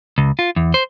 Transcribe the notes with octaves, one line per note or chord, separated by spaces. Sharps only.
C#2
F4
E2
C5